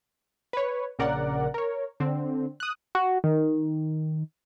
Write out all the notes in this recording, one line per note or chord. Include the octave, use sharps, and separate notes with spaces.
B4 C#5
A#1 C#3 A#4 D5 F#5
A#4 C#5
D3 C4
D#6 F#6
F#4
D#3